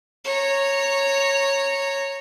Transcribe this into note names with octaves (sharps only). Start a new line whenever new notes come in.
C#5 A#5